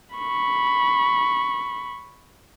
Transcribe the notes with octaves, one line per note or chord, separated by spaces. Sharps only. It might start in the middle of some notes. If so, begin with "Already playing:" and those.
B5 C#6